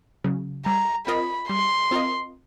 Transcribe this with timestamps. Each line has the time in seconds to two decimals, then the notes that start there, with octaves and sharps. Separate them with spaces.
0.24 C#3 F#3
0.66 G3 A#5
1.07 C4 F4 A#4 D#5 B5
1.49 G3 C6
1.91 C4 F4 A#4 D#5